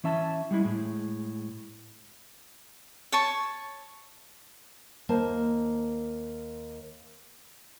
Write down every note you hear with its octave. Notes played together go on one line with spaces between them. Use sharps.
E3 C#4 E5 A5
G3 G#3 E4
A2 G#3
C#5 A5 C#6
D#2 A#3 C5 A5